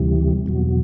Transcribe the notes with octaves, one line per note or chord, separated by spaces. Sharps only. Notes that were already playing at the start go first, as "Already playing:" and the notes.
Already playing: D2 C3 E3 G3
E2 B2 F#3